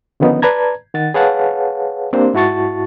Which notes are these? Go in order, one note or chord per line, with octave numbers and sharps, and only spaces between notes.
D3 D#3 F3 B3 C#4 D#4
B4 D5 A5 A#5 G#6
D#3 F#5 A6
G#4 B4 C#5 F5 F#5 A5
A#3 C4 D4 G4 C5
G#2 E4 F#4 A5 C#6 A6